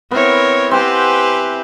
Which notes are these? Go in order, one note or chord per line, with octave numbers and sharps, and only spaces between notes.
B3 C4 E4 A#4 C#5
C4 G4 B4 C5 F#5 G#5